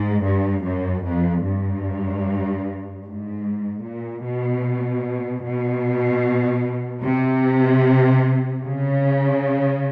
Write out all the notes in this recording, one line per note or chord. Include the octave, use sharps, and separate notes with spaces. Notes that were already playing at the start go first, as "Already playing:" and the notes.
Already playing: G#2
G2
F#2
F2
G2
G#2
A#2
B2
B2
C3
C#3